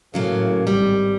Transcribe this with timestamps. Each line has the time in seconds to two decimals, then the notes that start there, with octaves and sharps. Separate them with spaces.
0.14 A2 C#3 F#3 A#3
0.67 G#1 G3